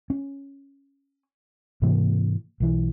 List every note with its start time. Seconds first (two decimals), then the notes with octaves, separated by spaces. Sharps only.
0.10 C#4
1.82 G#2 C3 E3 A#3
2.60 B1 E3